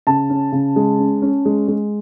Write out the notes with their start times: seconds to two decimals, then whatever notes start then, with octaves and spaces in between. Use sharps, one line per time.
0.07 C#3 A5
0.30 C#4
0.52 C#3
0.76 G#3
0.99 C#4
1.22 C#4
1.45 G#3
1.68 G#3